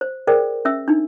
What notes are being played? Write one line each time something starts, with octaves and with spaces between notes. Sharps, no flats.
C5
G#4 A#4 C5 D5 G5
C#4 E5 E6
D4 D#4